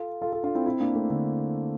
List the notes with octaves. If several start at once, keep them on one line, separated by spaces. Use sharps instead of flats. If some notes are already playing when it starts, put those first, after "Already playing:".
Already playing: F4 A4
F4 A4
F4 A4
D4 F4
C4 E4
C4 E4
A#3 D4
A3 C4
D3